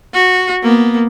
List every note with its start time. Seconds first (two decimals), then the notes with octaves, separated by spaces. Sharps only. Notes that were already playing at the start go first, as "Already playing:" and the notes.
0.14 F#4
0.62 A#3 B3